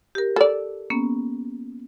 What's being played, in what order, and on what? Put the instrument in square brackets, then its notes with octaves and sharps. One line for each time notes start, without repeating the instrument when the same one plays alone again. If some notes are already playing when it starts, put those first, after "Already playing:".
[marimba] G4 A#4
[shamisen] A4 D5
[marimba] A#3 B3 C#4